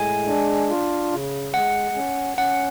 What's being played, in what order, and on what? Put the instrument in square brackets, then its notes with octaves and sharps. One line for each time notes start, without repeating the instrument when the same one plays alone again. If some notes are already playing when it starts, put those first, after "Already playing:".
Already playing: [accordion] A2 G#3 [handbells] G#5
[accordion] D4
F4
C#3
[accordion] G#3 [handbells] F#5
[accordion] C#4
[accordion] C#4 [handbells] F#5